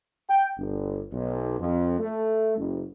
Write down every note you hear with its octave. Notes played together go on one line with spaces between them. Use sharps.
G5
G1
B1
F2
A3
F#1